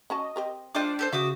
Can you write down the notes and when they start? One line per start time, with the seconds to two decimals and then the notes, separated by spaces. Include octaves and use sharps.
0.10 C#4 F#4 D#5 A5
0.36 C4 G4 A#4
0.75 G#3 D4 F4 C5 D#5 G5 D6
0.99 G4 A4 C5
1.13 C#3 F#4 E5 F#5 D6 D#6